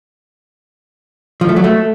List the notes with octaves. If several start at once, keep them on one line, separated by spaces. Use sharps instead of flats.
F3
A3
F#3
A3